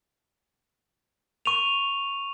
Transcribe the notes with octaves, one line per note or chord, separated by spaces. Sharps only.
C#6 D#7 F7